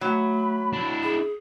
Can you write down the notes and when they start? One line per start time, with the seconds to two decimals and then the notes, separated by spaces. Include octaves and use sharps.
0.01 F#3 A3 B5
0.73 D4 E4
1.03 G#4